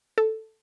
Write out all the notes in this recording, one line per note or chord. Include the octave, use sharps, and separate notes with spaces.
A4